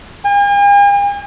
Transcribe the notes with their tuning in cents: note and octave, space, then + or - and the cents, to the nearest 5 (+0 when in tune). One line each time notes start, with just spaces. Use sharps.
G#5 -45